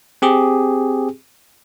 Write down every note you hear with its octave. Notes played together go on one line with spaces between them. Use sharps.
C4 G4 G#4